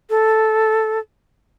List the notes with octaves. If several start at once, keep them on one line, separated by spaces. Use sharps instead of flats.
A4